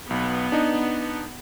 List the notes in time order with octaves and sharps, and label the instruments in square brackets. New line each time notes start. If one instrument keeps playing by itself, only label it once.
[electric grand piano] B1 [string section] B3
[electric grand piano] D4 D#4